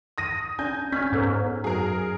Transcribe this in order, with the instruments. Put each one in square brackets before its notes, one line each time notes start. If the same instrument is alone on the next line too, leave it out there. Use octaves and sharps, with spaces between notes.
[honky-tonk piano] D#6 A#6 D#7
[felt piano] D4 [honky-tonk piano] G#5 G6
[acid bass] C#4 [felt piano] C#6 F6 G#6 [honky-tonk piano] B6
[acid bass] G#2 [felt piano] B3 A4 C#5
[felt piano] F#2 [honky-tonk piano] G#4 A#4